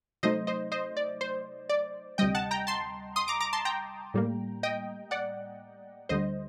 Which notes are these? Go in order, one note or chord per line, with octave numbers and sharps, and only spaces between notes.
C3 F#3 A3 D#4 C5 D#5
C5 D#5
C5 D#5
D5
C5
D5
D2 C3 G3 D#5 G5
F#5 A5
G5 A#5
A5 C6
C6 D#6
A#5 D6
A#5 D6
A5 C6
G5 A#5
A2 G3 A#3
D#5 G5
D5 F#5
D2 D3 G3 C5 D#5